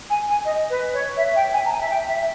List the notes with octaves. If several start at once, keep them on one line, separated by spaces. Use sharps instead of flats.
G#5
G#5
D#5
B4
C#5
E5
G5
G#5
A#5
G#5
E5
G5
E5